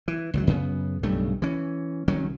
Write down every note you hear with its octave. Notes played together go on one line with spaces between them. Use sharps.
E3
C#2 D#3 F#3
F#2 C#3 B3
B1 G2 C#3 A3
E3 C#4
C2 D#3 F#3 C#4